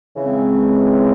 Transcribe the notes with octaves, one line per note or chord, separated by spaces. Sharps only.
C#3 E3 G#3 C4